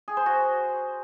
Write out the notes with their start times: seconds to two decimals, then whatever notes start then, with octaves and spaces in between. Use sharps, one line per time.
0.08 G#4
0.17 C5
0.26 F#4